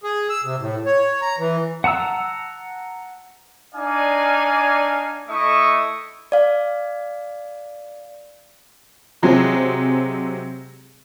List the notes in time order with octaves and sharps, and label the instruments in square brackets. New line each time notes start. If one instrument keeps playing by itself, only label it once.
[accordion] G#4
E6
C3
A2
C#5
A#5
E3
[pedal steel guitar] F#5 A5 A#5 E6
[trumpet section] D4 D#4 D5 F5 G#5
A3 E4 D#5 E5 C#6 D#6
[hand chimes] D5 F5
[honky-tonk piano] C3 F#3 G#3 C4